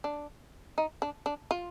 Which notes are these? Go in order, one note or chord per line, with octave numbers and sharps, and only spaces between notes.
D4
D#4
D4
D4
F4